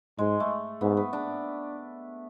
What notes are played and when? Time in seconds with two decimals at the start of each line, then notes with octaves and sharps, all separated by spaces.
0.18 G#2 G#3
0.40 A3
0.81 G#2 B3
0.97 B3
1.13 D4